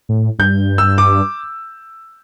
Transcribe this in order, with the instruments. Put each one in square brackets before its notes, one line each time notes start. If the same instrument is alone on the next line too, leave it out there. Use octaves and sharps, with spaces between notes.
[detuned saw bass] A2
[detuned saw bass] G2 [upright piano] G6
[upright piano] E6
D6